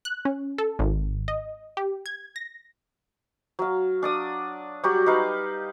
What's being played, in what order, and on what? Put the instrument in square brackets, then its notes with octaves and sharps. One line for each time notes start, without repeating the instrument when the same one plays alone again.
[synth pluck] F#6
C#4
A4
G#1
D#5
G4
G#6
A#6
[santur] F#3 F5
D4 D5 D#6
F#3 G3 F#4 G4
D#4 B4 F5